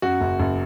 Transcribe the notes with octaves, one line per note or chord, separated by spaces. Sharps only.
F#2 F#4
F#1
F#1